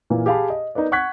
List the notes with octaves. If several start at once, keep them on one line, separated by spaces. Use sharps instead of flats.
A#2 E3 A#3
G4 G#4 F5 A5 B5
D#5
B3 D#4 A#4 B4 D5
F#5 C#6 F#6 G#6 B6